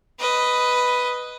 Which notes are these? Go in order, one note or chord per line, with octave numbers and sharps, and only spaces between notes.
B4 D#5